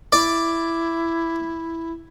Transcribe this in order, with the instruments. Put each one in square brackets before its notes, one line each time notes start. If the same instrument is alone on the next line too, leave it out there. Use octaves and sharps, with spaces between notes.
[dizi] E4 [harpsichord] D5